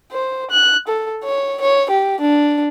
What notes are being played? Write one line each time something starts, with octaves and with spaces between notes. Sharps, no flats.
C5
F#6
A4
C#5
C#5
G4
D4